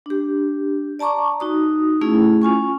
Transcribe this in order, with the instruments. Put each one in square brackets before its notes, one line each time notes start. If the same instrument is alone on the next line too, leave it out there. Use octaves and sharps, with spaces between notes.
[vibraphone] D4 G4
D5 A5 A#5 C#6 D6
D#4 F#4 D#6
A3 C#4 E4 G#4
C#4 F4 G#5 C#6